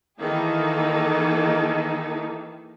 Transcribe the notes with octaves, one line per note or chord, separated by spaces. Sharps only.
D#3 E3 A#3 D#4 G#4 A4